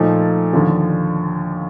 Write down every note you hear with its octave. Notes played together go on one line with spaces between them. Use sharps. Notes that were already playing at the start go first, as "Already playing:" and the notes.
Already playing: A#2 F3 A3 D#4
D#2 D3 F3